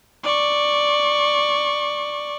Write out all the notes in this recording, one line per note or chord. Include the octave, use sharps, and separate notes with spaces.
D5 C#6